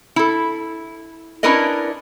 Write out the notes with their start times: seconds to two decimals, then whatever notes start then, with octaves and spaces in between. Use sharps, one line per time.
0.16 E4 A4
1.43 C#4 D4 E4 A#4 B4 D#5